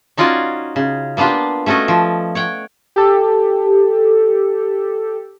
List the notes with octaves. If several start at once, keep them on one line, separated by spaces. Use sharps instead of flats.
C#4 D#4 F4 F#4 D5 G#5
C#3
A#3 B3 D4 F4 G4
A3 C#4 F#4 A4 D#5
F3
C#5 F#5 G5
G4 A4